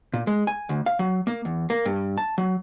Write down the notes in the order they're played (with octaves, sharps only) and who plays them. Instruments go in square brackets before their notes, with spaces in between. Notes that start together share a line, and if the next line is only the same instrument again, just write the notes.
[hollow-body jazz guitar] A#2
G#3
G#5
D2
F5
F#3
A#3
E2
A#3
G2
A5
F#3